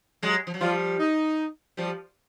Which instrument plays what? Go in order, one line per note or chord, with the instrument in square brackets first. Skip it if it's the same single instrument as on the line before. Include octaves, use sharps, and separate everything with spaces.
[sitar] F#3 G#3
F3
F#3
[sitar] F3 G3 [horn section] F4
[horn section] D#4
[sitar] F3 G3